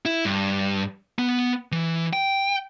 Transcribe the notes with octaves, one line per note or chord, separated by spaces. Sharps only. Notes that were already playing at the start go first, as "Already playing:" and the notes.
E4
G2
B3
E3
G5